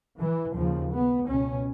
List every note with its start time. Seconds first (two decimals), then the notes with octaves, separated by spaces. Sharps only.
0.19 E3
0.55 D#2 C#3 F3
0.91 B3
1.28 C#2 B2 C#4